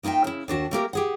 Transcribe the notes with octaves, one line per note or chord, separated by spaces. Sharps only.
A#3 D#4 F4 E5 G5
C#3 E4
D#2 D4 F#4 A5
A3 A#3 G4 A#4
G4 G#4 F#5